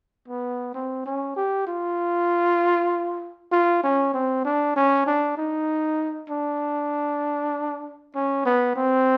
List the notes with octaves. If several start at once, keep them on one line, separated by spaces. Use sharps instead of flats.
B3
C4
C#4
G4
F4
F4
C#4
C4
D4
C#4
D4
D#4
D4
C#4
B3
C4